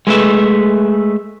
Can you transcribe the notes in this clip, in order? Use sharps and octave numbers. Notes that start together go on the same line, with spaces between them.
G#3 A3 B4 E5